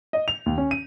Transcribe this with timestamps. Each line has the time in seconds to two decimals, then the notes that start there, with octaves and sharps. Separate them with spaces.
0.13 D#5
0.28 F7
0.46 D#2
0.58 C#4
0.71 D#7